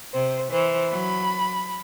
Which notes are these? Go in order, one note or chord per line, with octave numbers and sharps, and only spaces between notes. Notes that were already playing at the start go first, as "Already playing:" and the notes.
C3 C5
E3 C5
F#3 B5